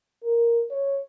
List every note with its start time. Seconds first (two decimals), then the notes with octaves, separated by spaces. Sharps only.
0.23 A#4
0.71 C#5